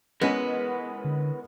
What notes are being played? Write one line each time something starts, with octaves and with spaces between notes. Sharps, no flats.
G#3 B3 C#4 E4 A#4 B4
D3